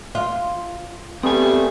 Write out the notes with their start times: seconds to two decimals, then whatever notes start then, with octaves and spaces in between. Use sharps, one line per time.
0.15 F4
1.23 G3 A3 B3 C4 G4 G#4 G#5